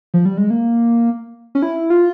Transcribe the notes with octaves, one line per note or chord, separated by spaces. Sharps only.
F3
G3
G#3
A#3
C#4
E4
F4